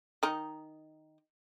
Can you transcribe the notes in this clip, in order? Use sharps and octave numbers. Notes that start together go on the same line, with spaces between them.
D#3 D#4